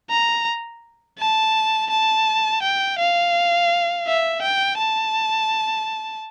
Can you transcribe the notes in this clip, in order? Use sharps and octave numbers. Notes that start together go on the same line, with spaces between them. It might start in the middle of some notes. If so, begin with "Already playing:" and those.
A#5
A5
A5
G5
F5
E5
G5
A5